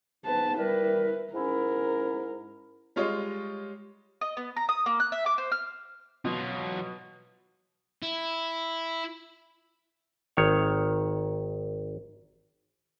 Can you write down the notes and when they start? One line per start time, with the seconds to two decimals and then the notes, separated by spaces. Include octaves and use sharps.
0.25 G#2 B3 D#4 B4 A5
0.57 G3 E4 A#4 B4
1.33 G#2 C#4 E4 A#4
2.96 G3 G#3 F4 C#5 D#5
4.21 D#5
4.37 B3
4.56 A#5
4.69 D#6
4.86 A#3
5.00 F#6
5.12 E5
5.26 D6
5.38 C5
5.52 F6
6.25 B2 F#3 F4
8.02 E4
10.37 G#1 D#3 C#5